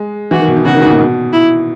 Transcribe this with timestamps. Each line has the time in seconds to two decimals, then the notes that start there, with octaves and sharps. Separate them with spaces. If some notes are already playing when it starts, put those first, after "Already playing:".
Already playing: G#3
0.31 E3 F#4
0.40 D#3
0.48 B2
0.56 D#3
0.65 C#3 F#4
0.74 D#3
0.82 G#2
0.90 A#2
0.99 B2
1.33 E4